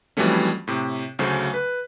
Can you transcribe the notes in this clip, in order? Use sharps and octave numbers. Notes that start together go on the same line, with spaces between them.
F2 E3 F#3 G3 A3 C#4
A2 C3
D2 C#3 F#3 A3 C5
B4